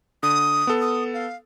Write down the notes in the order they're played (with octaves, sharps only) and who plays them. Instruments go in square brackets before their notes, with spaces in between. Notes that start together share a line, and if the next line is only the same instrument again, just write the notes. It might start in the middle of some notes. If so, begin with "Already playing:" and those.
[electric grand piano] D3 [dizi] D#6
[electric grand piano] B3 A4
[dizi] D#6
F5